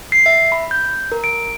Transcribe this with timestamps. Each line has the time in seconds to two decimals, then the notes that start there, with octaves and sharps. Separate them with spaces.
0.12 C7
0.26 E5
0.52 B5
0.71 G6
1.12 A#4
1.24 D7